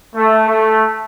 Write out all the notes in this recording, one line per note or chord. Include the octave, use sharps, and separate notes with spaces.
A3
A3